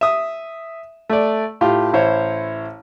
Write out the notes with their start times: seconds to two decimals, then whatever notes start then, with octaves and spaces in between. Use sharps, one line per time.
0.01 E5 D#6
1.09 A3 D5
1.61 A2 F4 G4
1.93 A1 E4 C5 C#5